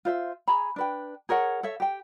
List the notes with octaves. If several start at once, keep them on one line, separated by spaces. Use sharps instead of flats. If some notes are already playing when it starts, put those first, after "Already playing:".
F4 C5 E5
G#4 G#5 A#5 B5
D4 B4 G5
G#4 A#4 C#5 F#5
A4 C#5 E5
G4 G5